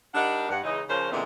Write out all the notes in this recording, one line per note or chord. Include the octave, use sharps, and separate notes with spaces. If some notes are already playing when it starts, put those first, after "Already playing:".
G3 D4 D#4 A#4 F#5
G2 F#5
C#3 E3 G#3 D#4
C#3 F3 C#4 A#4 C5
A#2 D3 E3 G#3 B3 C4